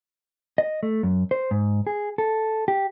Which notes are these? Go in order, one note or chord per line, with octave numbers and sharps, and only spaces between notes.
D#5
A3
F#2
C5
G#2
G#4
A4
G4